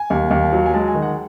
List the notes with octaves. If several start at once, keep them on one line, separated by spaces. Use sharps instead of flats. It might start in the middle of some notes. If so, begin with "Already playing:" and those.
Already playing: G#5
D#2
D#2
F#3
G#5
G#3 A5
G#5
D#3
F#5